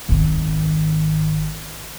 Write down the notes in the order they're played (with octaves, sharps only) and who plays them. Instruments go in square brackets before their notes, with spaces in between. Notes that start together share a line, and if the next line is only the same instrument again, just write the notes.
[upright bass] G#1 D#3